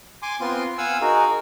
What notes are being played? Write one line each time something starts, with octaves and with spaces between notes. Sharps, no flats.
G#5 C6 D6
B3 C4 F4 C6
F5 F#5 G#5 E6
D#4 F#4 G#4 A#4